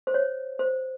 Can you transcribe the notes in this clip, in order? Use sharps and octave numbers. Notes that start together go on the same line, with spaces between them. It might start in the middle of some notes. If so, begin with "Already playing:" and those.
C5
C#5
C5